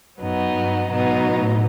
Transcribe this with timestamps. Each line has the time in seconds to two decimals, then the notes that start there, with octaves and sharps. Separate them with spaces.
0.19 F#2 F#3 B3 D#4
0.54 G2
0.89 G#2 B2 F#3 B3 D#4
1.24 A2